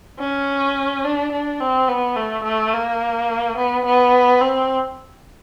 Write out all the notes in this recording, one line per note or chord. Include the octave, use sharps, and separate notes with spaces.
C#4
D4
D4
C4
B3
A3
A3
A#3
B3
B3
C4